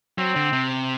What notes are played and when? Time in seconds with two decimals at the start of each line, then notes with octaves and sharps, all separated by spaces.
0.18 F#3 C4
0.36 D3
0.53 C3